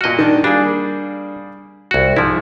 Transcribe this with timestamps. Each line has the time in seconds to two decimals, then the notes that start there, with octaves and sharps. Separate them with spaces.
0.01 A#2 F#4 D#5 F6
0.19 D#3 D4
0.44 G3 A#3 D4 G#4
1.91 C2 F#4
2.16 G#2 F3 E4